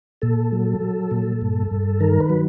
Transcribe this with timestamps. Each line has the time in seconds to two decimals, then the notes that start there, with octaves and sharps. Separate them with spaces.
0.22 A#2 A4
0.52 F#3
0.81 F#3
1.11 A#2
1.42 G2
1.71 G2
2.00 D#3 A#4
2.20 B4
2.30 F#3